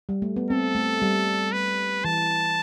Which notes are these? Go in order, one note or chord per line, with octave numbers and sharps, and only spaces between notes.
G3
A3
B3
C4 A4
A3
G3
B4
E3 A5